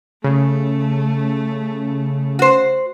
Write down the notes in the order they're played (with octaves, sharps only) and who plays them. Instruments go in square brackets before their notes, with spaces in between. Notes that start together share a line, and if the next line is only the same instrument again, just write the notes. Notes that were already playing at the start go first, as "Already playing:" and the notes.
[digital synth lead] C#3 [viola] A3
[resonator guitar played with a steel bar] F#4 C5